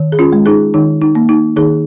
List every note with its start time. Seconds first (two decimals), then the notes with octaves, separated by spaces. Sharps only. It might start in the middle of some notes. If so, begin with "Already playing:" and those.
Already playing: D#3
0.12 G#4
0.19 C#4 F4
0.33 G#3
0.46 D#4 G#4
0.74 D#3 D#4
1.02 D#4
1.15 A#3
1.29 D#4
1.56 D#3 D#4 G#4